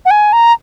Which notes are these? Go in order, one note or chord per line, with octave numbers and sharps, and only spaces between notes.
F#5
G#5
A#5